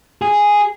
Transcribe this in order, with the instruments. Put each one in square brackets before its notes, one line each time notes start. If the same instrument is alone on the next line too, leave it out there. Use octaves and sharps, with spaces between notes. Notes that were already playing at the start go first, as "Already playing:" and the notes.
[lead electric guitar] G#4